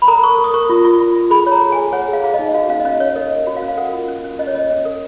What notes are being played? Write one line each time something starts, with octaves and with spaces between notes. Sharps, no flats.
B5
A#4 A#5
A#4 C#6
A#4
D#6
A#4 C#6
F4
F4
F4
F4
G#4 B5
C#5
A#5
G#4
G#4 G#5
C#5 F#5
G#4 F5
G#4 F5
D#5
D#4
F#4 F5
C#4 F5
D#5
C#4 F5
C#4 C#5
A#4 D#5
C#4
F#4
F5
C#4
F5
A#4 F#5
F4
C#4
C#4
C#4 D#5
C#5
C#4 D#5
C#4
A#4